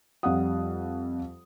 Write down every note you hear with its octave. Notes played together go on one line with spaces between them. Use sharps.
F2 G3 F5 F#5 D#6